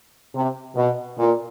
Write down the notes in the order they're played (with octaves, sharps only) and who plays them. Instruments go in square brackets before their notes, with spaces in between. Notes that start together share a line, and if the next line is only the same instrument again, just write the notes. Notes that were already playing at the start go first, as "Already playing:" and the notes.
[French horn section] C3
B2
A#2